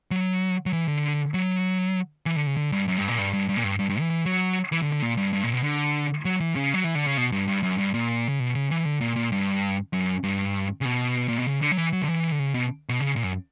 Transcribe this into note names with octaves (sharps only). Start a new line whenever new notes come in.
F#3
F#3
E3
D3
F#3
E3
D3
C#3
D3
G2
F#2
G2
A#2
G2
G2
G2
A#2
G2
G2
G2
E3
E3
F#3
E3
D3
D3
A#2
G2
G2
A#2
B2
D3
F#3
E3
C#3
F#3
E3
D3
C#3
B2
G2
G2
F#2
G2
A#2
C#3
B2
C#3
E3
D3
A#2
A#2
G2
F#2
G2
C#3
B2
A#2
B2
C#3
D3
F#3
E3
F#3
D3
E3
D3
C#3
B2
B2
C#3
A#2
F#2